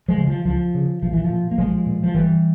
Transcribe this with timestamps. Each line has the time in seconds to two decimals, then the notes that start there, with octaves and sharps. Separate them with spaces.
0.08 F3 G#3
0.17 C#3
0.28 F3
0.45 C#2 F3
0.74 C#3
1.02 A#1 F3
1.13 E3
1.24 F3
1.30 A#2
1.51 A#3
1.58 A#1 F3 G#3
1.86 A#2
2.04 F3
2.14 G1 E3 G3